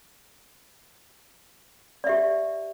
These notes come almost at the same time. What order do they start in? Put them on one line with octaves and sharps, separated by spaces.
D5 E5 G4